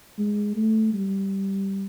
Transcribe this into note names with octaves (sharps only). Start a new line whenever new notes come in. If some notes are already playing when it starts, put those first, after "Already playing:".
G#3
A3
G3